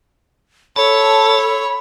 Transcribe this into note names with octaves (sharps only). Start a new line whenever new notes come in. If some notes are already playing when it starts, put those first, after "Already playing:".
A4 C#5 A5 B5